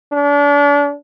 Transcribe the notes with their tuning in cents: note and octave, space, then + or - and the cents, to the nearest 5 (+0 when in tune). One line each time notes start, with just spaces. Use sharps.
D4 -35